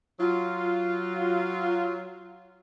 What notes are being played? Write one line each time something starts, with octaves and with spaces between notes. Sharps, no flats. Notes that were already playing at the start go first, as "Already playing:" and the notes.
F#3 F4